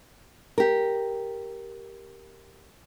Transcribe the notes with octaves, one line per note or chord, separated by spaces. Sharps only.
G4 A#4